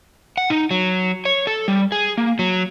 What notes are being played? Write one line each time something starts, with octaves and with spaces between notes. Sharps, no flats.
F#5
D#4
F#3
C#5
A4
G3
G#4
A#3
F#3